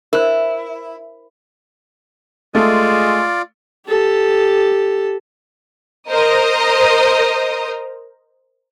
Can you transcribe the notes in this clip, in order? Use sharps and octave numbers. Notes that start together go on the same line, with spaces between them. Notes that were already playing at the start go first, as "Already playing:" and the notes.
E4 A#4 C5
G#3 A3 F4 D5
G4 A4
A#4 C5 D#5 A#5 D#6